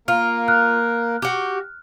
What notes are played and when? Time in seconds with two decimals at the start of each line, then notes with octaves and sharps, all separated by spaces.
0.08 A#3 F4 A#4 F6
0.48 F6 F#6
1.22 F#4 G4